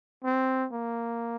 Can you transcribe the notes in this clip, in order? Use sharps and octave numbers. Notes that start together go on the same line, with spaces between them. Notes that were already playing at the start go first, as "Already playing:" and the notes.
C4
A#3